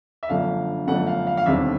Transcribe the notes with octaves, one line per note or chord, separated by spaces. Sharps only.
E5
G1 F#2 D3 F3 A3 F5
G1 F#2 D3 F3 A3 F#5
F5
F5
F5
E1 D#2 D3 G3 C4 E5